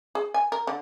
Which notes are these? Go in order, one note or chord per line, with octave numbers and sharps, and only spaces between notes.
G#4
G#5
A#4
D3